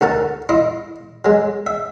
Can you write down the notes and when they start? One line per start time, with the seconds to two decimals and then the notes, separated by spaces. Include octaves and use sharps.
0.01 D2 F#4 A#4 A5
0.49 E4 F4 D#5
1.25 F#3 G#3
1.66 E5